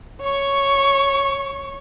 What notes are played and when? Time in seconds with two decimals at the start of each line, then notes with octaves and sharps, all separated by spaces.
0.22 C#5 C#6